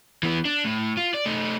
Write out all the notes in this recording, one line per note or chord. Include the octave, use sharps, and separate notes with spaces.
E3 B3
D4
A2
F4
D5
A3 D#4